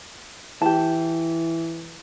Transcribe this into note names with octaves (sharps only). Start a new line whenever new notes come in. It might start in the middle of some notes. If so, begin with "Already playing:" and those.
E3 G4 A5